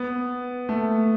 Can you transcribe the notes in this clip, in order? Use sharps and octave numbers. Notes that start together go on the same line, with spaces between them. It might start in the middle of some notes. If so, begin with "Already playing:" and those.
Already playing: B3
A3